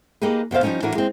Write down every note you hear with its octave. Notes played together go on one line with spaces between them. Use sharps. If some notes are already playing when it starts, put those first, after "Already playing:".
A#3 D#4 G4 G#4 B4
D2 C3 B3 C5 F5
F3 G3 A3 C#4 D#4
A2 E3 D4 F#4 A#4 G#5
G#3 C4